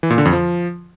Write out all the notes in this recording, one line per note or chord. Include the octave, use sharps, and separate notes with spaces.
E3
A#2
D3
F2
F3